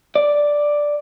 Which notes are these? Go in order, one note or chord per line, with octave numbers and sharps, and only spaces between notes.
D5